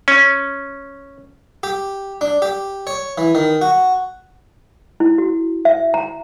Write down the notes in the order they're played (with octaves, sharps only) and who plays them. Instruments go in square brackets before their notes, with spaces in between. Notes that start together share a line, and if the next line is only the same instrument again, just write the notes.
[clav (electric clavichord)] C#4
[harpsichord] G4
D4
G4
C#5
E3
D#3
F#4
[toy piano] E4
F#4
E5
A#5